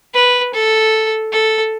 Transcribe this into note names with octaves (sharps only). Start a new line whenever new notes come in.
B4
A4
A4